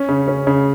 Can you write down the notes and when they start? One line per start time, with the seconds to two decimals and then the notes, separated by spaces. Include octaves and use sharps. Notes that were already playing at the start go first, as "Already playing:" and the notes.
Already playing: C#4
0.09 C#3
0.28 C#4
0.47 C#3